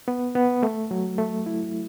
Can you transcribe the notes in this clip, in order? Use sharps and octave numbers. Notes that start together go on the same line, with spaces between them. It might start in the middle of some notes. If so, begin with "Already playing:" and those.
B3
B3
A3
F#3
A3
E4